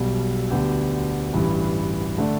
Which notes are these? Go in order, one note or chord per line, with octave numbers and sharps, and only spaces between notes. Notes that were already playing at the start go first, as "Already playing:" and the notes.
Already playing: B1 B2 G3
D2 D3 B3 G4
A1 G2 E3
D3 A3 D4